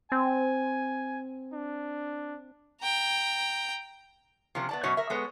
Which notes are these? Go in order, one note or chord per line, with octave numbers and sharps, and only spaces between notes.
C4 G#5
D4
G5 A#5
C3 F3 A#3 C#4
B3 D5 A5
F#2 B2 C#4 F#4 C#5
A#4 E5
G#3 B3 A4 C#5